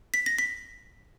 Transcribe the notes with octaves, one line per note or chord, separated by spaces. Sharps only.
B6
A#6
B6